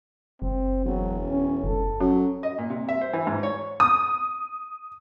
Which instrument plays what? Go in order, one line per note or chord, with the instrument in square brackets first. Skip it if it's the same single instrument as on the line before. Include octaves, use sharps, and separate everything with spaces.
[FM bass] F#1 [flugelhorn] C4
[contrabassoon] E1 [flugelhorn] F#3
[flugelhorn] C#4
[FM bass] F#1 [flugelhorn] A4
[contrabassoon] F#3 [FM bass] C#4
[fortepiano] D#5
A#2
C3
E5
C5
E3
G#2
C#5
[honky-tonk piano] D#6